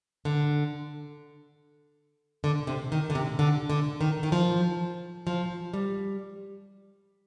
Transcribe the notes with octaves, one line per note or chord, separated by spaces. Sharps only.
D3
D3
C3
D#3
D3
C3
D3
D3
D#3
D#3
F3
F3
G3